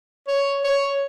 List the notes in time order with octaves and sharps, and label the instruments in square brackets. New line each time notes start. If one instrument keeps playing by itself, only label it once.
[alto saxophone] C#5
C#5